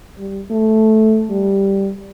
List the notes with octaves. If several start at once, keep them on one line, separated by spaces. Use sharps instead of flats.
G3
A3
G3